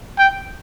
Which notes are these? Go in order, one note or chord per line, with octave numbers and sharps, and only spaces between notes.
G5